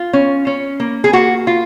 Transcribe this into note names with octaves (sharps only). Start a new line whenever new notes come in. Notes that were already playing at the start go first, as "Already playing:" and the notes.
Already playing: F4
C#4
C#4
A#3
G#4
A#3 F#4
F4